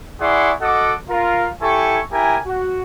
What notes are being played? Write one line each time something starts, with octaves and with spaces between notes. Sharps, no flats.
E4 G#4 D5 F#5 C6 C#6
F#4 A4 D#5 F#5 A5 D6
F4 A#4 F5
E4 G4 A4 G#5 C#6
E4 G4 A#4 G#5
F#4